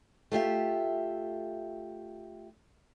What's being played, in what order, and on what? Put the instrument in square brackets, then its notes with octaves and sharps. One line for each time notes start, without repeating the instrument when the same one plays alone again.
[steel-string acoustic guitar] A3 F4 G4 E5